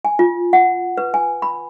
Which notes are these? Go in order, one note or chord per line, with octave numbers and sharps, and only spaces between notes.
G#5
F4
F#5
B4
G#5
B5